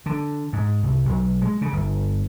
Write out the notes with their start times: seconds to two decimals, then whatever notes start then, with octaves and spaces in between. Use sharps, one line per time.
0.06 D3
0.53 G#2
0.83 C2
1.05 B1
1.41 G#3
1.61 C#3
1.73 G1